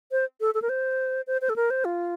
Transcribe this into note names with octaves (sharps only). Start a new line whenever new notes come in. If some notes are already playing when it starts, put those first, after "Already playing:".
C5
A4
A4
A#4
C5
C5
C5
A4
A#4
C5
F4